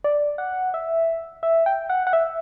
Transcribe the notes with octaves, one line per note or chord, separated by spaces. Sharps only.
D5
F#5
E5
E5
G5
F#5
F#5
E5